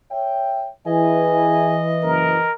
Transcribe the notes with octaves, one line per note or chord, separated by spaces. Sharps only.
C#5 E5 G5
E3 G#4 D#5 E5 G#5
F#1 A#4